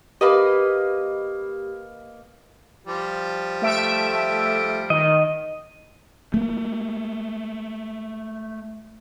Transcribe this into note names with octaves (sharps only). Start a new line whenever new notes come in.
A#3 G4 B4 D#5
F3 G3
A3 E5 D7
D#3 D#5
A3 A#3